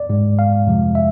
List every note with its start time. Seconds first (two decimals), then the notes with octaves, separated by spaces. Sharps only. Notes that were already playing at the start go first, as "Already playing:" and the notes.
Already playing: D5
0.09 G#2 G#3
0.39 F5
0.66 F2 C3 F3 G#3
0.95 E5